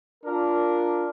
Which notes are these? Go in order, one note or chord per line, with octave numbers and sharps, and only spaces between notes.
D4 F4 A#4